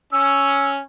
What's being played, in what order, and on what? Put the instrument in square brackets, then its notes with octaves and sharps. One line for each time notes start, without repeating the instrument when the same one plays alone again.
[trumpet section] C#4 [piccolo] E6